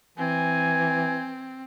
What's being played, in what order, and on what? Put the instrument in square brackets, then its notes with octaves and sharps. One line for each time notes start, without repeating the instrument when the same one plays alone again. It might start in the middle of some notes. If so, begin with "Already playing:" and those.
[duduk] E3 [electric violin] C4 [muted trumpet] G#5